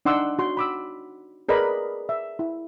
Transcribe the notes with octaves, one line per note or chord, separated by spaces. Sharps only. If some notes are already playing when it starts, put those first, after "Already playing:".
D4 D#4 F#5 C6 D6 E6
F#4 C6
B5 D6 E6
G#4 A#4 B4 D5 D#5 B5
E5
E4